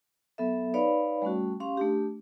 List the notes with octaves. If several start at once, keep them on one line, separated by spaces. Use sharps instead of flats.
F#3 B3 A4 E5
D#4 B4 C#5 D5 F5 B5
G3 A3 C#4 F#4
C#4 G4 F5 C6
A3 D4 G4